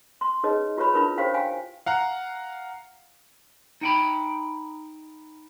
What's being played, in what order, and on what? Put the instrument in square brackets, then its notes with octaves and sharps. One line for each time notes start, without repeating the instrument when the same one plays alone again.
[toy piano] C6
D#4 G#4 B4 C#5 D#5
F4 G4 B4 C#5 B5
D4 E4 F4 A#4 B4 B5
G4 C5 C#5 F5 G5
G4 F5 G5 G#5
[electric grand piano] F5 F#5 A#5
[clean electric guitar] D#4 G5 B5